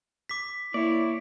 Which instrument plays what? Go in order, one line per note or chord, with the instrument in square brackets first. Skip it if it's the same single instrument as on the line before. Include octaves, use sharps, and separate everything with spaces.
[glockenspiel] D6 B6
[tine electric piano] A#3 [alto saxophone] E4 [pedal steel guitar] C#5 D5